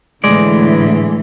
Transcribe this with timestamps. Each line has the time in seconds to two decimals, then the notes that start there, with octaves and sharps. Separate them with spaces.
0.24 A2 D3 E3 G#3 D5